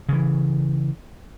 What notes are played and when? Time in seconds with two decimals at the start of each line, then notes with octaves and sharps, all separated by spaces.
0.09 C#3 E3